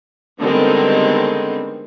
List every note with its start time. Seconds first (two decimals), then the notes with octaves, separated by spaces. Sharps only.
0.41 D3 D#3 G3 G#3 B3 C4